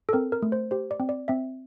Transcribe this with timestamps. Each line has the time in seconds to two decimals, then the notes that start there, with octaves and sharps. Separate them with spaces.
0.09 A4
0.13 C4 A#4
0.32 A#4
0.42 A3
0.52 C5
0.71 G4 C5
0.91 D5
1.00 C4
1.09 D5
1.28 C4 E5